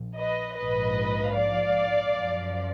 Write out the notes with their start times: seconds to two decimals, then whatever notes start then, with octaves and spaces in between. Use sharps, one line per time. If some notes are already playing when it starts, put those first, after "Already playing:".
Already playing: A#1
0.17 B4 D#5
0.57 A#1 G#2 F3 B4 D#5
1.37 D5 F5
2.15 F#2 F3